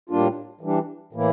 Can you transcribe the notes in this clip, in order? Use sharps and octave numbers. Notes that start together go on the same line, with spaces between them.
A2 G3 A#3 D4 F4
E3 G3 D4
A2 E3 A#3 E4